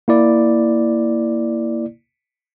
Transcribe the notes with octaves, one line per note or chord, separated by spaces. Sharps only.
A#3 E4 D5